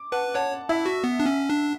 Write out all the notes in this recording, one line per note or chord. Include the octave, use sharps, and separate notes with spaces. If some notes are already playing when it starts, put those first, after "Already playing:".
Already playing: D6
B4 F#5 A5
C#5 F#5 A5
E4 E5
F#4
B3
D4
C#4
D4